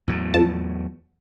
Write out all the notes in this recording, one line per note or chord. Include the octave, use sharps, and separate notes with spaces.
E2 A2 F#3
F2 F3 A5